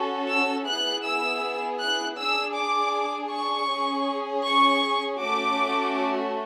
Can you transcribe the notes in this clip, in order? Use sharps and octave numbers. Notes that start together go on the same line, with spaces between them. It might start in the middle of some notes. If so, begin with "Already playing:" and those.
Already playing: C#4 F#4 A4
E6
B3 E4 G#4 F#6
E6
F#6
D4 G#4 E6
D6
C#6
C#4 G#4
C#6
A3 C#4 F#4 D6